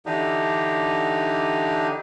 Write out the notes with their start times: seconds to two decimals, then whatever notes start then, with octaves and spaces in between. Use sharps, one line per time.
0.06 D3 E3 D4 D#4 G4